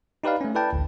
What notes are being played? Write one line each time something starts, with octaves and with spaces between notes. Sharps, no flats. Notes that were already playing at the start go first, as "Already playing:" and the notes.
D#4 G4 B4 D5 F5
A3 C#4
E4 A4 B4 D5 G5 A5
A1 D2